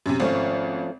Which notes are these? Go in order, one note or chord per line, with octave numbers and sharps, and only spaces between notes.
F#2 C3
G#1 F3 A3 C#4